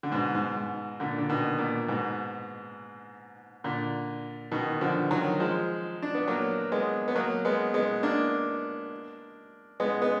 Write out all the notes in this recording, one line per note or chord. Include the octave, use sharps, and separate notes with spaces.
D3
G#2 B2
G#2
G#2
A#2 D3
D3
B2 D#3
A#2
G#2 B2
A#2 D3
B2 D#3
D3 F3
D#3 F#3
F3 G#3
D4
B3
F#3 A#3
G#3 B3
B3
F#3 A#3
G#3 B3
G#3 B3
A#3 D4
G#3 B3
G#3 B3